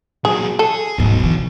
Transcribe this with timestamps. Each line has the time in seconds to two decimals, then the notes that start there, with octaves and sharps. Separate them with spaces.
0.25 A#2 F#3 G#4
0.59 G#4 A4
0.98 D1 B1 G#2 B2
1.20 D3 E3